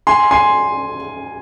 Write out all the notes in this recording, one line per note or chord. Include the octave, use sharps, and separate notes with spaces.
G#5 C6
G#5 C6